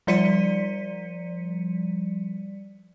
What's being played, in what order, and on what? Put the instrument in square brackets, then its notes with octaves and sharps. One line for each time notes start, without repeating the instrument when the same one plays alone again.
[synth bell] F3 G3 D5 B6 C#7 D#7